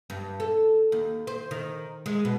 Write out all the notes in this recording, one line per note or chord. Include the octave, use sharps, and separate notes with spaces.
G2
A4
D#2
C5
D#3
G#3
B2